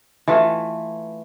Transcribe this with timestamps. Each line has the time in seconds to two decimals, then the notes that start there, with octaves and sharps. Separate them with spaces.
0.28 E3 A3 F4 F#5